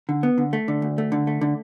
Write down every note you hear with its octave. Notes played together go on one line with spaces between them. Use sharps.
D3
B3
D3
A3
D3
D2
A3
D3
A3
D3